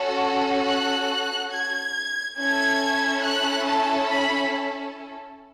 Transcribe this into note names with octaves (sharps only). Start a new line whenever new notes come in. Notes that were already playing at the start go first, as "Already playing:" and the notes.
Already playing: C#4 F#4 A4
F#6
G#6
C#4 E4 A4 G#6
F#6
A5
B5